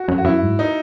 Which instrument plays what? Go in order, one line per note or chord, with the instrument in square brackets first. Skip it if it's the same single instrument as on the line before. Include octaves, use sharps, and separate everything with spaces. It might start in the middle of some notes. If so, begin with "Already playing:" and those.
Already playing: [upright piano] F#4
[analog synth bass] F#2
[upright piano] F#4
[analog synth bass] F#2 [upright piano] E4
[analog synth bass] G#2
[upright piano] D#4